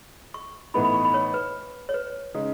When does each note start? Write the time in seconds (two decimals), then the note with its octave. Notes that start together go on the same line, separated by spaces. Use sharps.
0.34 C#6
0.74 A2 E3 B3 D#4 B5
0.84 B5
0.94 C#6
1.05 B5
1.14 C#5
1.34 B4
1.89 C#5
1.94 B4
2.34 C#3 G#3 D#4